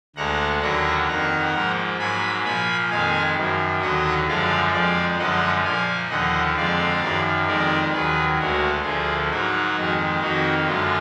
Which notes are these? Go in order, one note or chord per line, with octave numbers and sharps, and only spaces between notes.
D2 D3 G#3 F#5 A#5
D#2 D3 F#3 A#3 F#5 A#5
F2 D#3 A#3 F#5 A#5
G#2 F3 A#3
G#2 F#3 A#3 G#5 B5
A#2 F3 A#3 G#5 B5
F2 D#3 G#3 F5 G#5
F#2 D#3 A#3
D#2 D3 F#3 D#5 F#5
F#2 D3 F3 G#3 D5 F5
F2 F3 G#3 D5 F5
F#2 D3 F3 G#3 D#5 F#5
A#2 F3 A#3 F5 G#5
D#2 D3 F3 D#5 F#5
F2 D3 G#3 D5 F5
F#2 D#3 A#3
F2 D#3 G#3 A#4 D5
D#2 D#3 F#3 G#4 B4
D2 D3 G#3 F#4 A#4
D2 D3 F3 A#3 F4 G#4
G#2 F#3 A#3 D#4 F#4
F2 D#3 G#3
F2 D#3 A#3 D#4 F#4
F#2 D3 G#3 F4